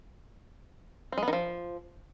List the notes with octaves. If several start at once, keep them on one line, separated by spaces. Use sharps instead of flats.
C4
G#3
B3
D#3
F3